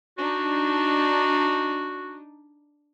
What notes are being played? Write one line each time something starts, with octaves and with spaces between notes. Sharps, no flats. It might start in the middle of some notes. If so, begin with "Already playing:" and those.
D4 D#4 F#4